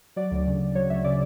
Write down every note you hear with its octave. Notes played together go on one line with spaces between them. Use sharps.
F#3 D5
D2
C#3
D2
F#3 C#5
D2 E5
C#3 D5